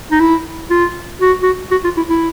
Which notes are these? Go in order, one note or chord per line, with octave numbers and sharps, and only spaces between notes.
D#4
E4
F4
F#4
F#4
F#4
F4
E4
E4